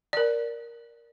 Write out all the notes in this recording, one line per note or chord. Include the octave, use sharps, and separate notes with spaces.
A#4 D5